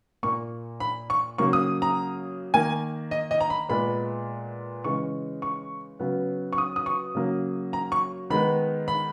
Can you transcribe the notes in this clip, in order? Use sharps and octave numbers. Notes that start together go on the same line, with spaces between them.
A#2 A#3 C#6
B5
C#6
C#3 F#3 A#3 C#6
D#6
A#5
D#3 A#3 G#5
D#5
D#5
A#5
B5
A#2 G#3 B3 B5
C#3 E3 G#3 C#6
C#6
C#3 F#3 B3
C#6
D#6
D#6
C#6
C#3 F#3 A#3
A#5
C#6
D#3 G#3 B3 B5
B5